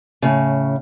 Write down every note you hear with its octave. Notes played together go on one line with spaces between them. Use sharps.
A2 C#3